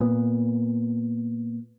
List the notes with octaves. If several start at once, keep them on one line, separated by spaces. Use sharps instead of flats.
A#2 B3